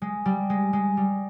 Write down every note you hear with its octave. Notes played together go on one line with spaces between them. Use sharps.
G#3
G3
G#3
G#3
G3